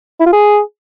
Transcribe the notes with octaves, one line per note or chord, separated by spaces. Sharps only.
E4
F4
G#4